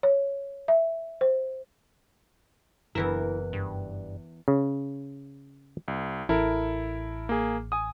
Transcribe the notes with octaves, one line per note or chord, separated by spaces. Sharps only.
C#5
E5
C5
F#1 E2 E3 E4 A#4
G2
C#3
C2
A1 E4 A4 A#4
A#3 G#4
G#5 D#6